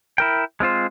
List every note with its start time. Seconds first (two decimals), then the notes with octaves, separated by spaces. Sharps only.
0.18 E4 A#4 G5
0.60 G#3 C4 F4 C5